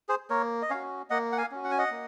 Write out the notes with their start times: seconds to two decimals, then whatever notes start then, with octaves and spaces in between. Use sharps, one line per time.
0.09 G#4 C5
0.30 A#3 A#4 C#5
0.62 D#5
0.70 C#4 F#4 C#5 F5
1.10 A#3 D#5 F#5
1.32 F#5
1.37 F5 G#5
1.52 C#4 F#4
1.64 F#5
1.71 G#5
1.78 D#5 F#5
1.91 A#3